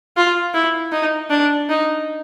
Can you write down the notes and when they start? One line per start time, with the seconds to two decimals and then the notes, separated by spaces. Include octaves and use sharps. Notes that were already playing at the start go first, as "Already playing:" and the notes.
0.17 F4
0.54 E4
0.92 D#4
1.30 D4
1.69 D#4